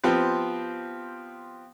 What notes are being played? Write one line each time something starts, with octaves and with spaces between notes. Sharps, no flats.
F3 B3 C4 G4